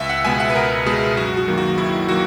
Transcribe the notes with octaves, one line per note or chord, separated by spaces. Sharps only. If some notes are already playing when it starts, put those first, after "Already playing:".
Already playing: C#2 E5
F#5
B2 G#3 B3 G#5
F#5
B4
C#2 A#4
B2 G#3 B3 G#4
F#2 F#4
F#4
D#3 F#3 A#3
F#4
F#2 E4
D#3 F#3 A#3 F#4